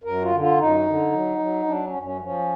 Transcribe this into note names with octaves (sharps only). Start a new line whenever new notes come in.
F#2 A#4
F4
D3
F4
F#2 D#4
D3
F#3
F#3
F#3 D4
C#4
F#2
C#4
F3 C#4